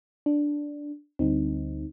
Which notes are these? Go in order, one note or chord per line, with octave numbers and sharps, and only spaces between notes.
D4
D2 D3 G3 C4 D#4